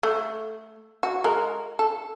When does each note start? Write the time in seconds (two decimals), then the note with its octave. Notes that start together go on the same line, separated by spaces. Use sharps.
0.03 A3
1.03 F#4
1.24 G#3 A#4
1.79 A4